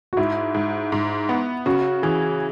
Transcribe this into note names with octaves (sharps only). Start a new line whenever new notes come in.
F#4
G#2 E4
G#2
G#2
B3
C#3 F#4
E3 G#4